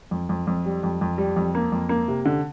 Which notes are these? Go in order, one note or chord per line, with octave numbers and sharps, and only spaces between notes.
F2
F2
F2
G3
F2
F2
G3
F2
A#3
F2
A#3
C3
D3